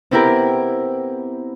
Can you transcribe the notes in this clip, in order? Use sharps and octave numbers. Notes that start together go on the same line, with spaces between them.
B3 C4 E4 G4 A#4